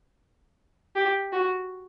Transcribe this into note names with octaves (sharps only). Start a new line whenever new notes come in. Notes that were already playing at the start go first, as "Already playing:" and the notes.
G4
F#4